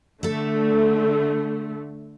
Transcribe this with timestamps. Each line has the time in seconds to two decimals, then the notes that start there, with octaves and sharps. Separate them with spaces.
0.23 D3 A3 A4 E5